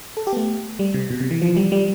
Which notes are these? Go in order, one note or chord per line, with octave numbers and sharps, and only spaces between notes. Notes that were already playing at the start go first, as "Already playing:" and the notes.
A4
G4
B3
A3
G3
C3
B2
C3
E3
F3
G3
G3